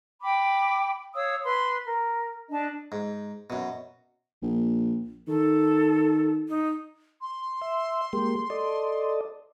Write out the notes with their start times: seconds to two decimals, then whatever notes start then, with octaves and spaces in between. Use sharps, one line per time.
0.22 G5 B5 D6
1.14 C#5 F5 D#6 E6
1.43 B4 C6
1.84 A#4
2.50 D4 D#5 A5
2.92 G#2
3.50 F#2 B2
4.42 A#1
5.28 D#3 A4
6.49 D#4
7.21 C6
7.61 E5
8.13 G#3 A#3 G4
8.50 A4 D5 D#5